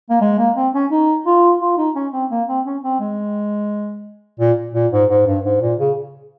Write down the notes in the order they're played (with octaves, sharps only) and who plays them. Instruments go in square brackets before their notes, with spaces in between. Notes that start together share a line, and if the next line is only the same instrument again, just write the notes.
[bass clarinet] A#3
G#3
A#3
C4
C#4
D#4
F4
F4
D#4
C#4
C4
A#3
C4
C#4
C4
G#3
A#2
A#2
G#2
G#2
G2
G#2
A#2
C#3